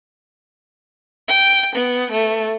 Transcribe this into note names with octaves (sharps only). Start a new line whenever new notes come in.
G5
B3
A3